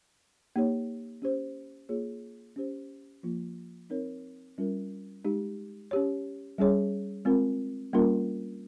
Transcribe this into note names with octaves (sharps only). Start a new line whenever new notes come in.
A#3 D#4 G4 C#5
C#4 G4 C5
A#3 F4 G#4 C#5
C#4 G4 C5
F3 A#3 F4
C4 D#4 A#4 C#5
G3 C#4 F4 A#4
G#3 D#4 G4
C#4 G4 C#5
G3 C#4 G#4 C#5
G#3 C4 F4 A#4
G3 A#3 C#4 F4 A#4